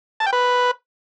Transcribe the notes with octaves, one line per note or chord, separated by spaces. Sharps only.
A5
G5
B4